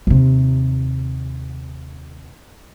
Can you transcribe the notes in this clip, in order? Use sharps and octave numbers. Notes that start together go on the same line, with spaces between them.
D#2 C3